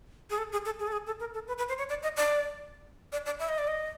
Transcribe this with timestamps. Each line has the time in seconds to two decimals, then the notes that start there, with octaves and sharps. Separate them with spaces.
0.30 G#4
0.38 A4
0.52 G#4
0.65 A4
0.79 G#4
0.87 A4
0.92 G#4
1.06 A4
1.20 A#4
1.34 A4
1.48 B4
1.58 B4
1.68 C5
1.78 C#5
1.89 D5
2.03 D#5
2.17 D5
3.12 D5
3.26 D5
3.39 E5
3.49 D#5
3.58 D5
3.67 D#5